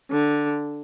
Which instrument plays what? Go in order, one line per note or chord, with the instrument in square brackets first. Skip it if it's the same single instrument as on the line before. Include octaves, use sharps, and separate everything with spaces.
[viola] D3